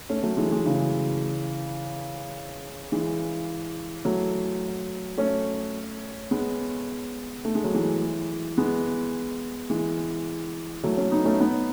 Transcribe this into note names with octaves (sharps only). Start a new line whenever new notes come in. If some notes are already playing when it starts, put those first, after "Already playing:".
A3 C#4
F#3 A3
E3 G#3
E3 G#3
C#3 E3
E3 G#3
F#3 A3
A3 C#4
G#3 B3
A3
G#3
F#3
E3 G#3
G#3 B3
E3 G#3
F#3 A3
A3 C#4
B3 D#4
A3 C#4
B3 D#4